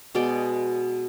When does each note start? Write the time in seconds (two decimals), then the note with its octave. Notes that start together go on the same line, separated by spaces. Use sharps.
0.15 B2 G#3 D5 G5